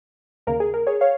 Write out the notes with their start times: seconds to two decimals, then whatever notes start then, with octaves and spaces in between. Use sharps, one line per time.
0.47 D#2 C#3 A#3 A#4
0.60 G#4
0.74 A#4
0.87 G#4 C#5
1.01 C#5 F5